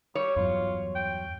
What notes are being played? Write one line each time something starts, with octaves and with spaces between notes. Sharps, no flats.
G3 C#5
E2 G2 F#3 F4
G5